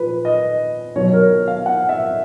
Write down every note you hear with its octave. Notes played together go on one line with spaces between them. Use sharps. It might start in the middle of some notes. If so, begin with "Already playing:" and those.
Already playing: A#2 F3 B4
D#5
B2 F#3 C#5
A#4
F5
F#5
E5